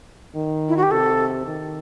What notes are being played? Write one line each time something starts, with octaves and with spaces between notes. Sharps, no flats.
D#3
E4
F#4
G4
C3 A4
D#3